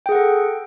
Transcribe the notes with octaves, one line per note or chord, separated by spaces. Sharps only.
G#4 A4 F#5 G5